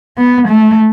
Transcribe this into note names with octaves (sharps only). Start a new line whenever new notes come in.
B3
A3